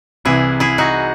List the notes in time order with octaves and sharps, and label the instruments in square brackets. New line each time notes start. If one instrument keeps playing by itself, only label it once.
[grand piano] C2 C3 E3 [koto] E4 G#4
[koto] E4 G#4
D#4 F#4